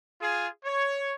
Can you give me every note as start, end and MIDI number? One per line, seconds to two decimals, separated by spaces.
0.21 0.48 65
0.21 0.48 68
0.65 1.13 73